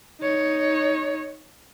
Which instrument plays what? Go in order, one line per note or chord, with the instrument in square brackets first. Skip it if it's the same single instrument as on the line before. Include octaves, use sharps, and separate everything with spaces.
[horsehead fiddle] D#4 C#5